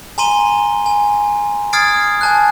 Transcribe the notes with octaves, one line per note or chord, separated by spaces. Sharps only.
G#5 A#5 C6 D#7 G7
G#5
D#6 F6 G#6 A6 C7 D7
G#5 A5 F#6